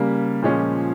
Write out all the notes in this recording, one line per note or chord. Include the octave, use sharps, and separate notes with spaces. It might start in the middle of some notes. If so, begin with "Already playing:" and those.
Already playing: C#3 G3 A#3
A#2 F3 G#3 C#4